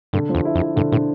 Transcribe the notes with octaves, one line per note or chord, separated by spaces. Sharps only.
G2 D3
F3
E2
E4
F2
E4
G2 D3
A2 D3